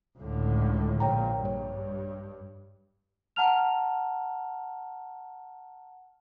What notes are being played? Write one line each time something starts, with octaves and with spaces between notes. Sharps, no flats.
C#2 A2 D3
A#1 A#2 C#5 G5 A#5
G2 C#5
F#5 A5 A#5 F6 F7